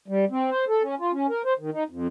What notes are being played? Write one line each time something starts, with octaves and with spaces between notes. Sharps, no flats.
G3
C4
C5
A4
C#4
F4
C#4
A#4
C5
D#3
D#4
F2